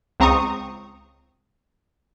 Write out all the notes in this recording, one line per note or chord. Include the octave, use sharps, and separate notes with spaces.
C#2 C4 A#5 C#6 D#6